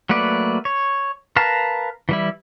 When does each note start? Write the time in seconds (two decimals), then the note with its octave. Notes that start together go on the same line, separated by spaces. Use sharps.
0.09 F#3 A3 A#3 B4 D5
0.65 C#5
1.36 A#4 B4 F5 A5 A#5
2.09 E3 G3 E4